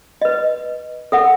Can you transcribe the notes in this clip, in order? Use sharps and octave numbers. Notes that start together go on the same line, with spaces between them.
B4 D#5
A4 A#4 E5 F#5